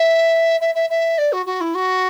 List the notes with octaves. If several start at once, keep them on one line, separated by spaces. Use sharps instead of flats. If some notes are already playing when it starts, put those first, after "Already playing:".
Already playing: E5
E5
E5
E5
D5
F#4
F#4
E4
F#4